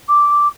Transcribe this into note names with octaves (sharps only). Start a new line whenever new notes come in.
D6